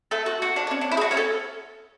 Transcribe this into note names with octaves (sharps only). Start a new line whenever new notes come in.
A3 A4
F#4
F#4
D4
D4
C#4
D4
E4
G#4
F#4
C#4 C#5
A4